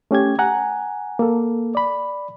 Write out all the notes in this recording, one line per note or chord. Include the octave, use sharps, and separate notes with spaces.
A3 C#4 G4 G#6
F#5 G#5 A#5
A#3 A4
D5 B5